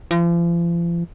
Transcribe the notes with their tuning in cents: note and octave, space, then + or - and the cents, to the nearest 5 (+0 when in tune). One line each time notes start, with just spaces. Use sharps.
F3 -40